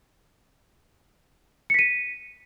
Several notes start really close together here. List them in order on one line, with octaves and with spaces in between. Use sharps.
C#7 B6 D#7